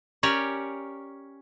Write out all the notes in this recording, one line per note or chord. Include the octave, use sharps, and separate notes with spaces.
C#4 G4 A#4 C#5 D5